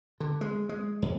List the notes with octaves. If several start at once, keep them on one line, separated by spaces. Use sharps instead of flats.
D3
G#3
G#3
F2